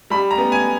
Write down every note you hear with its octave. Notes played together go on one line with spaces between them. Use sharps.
G3 B5
A#5
B3
G#5